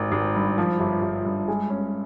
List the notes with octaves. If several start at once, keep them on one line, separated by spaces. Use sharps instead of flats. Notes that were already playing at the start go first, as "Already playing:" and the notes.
Already playing: G#1 D#3
G#1
G2
F3
G1
G1
G2
G#3
C#4